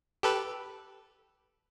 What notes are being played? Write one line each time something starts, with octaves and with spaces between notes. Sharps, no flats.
G4 A4 B4